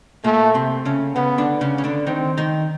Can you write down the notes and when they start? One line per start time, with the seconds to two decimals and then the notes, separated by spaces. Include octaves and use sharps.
0.24 A#2 A3 A#3
0.54 C3 C4
0.85 C#3 C#4
1.15 C#3 B3 C#4
1.38 D3 D4
1.61 C#3 C#4
1.78 C#4
1.84 D3 D4
2.06 D#3 C4 D#4
2.38 D#3 D#4